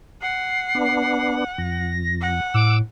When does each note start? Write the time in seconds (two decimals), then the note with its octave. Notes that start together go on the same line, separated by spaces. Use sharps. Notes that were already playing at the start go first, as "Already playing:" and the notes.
0.22 F#5 C7
0.75 B3 D4
1.58 F2 A#6
2.22 F#5
2.54 A2 D6 E6